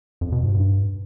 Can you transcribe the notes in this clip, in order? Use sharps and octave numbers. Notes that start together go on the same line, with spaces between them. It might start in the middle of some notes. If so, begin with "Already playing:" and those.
F2
B2
G#2
G2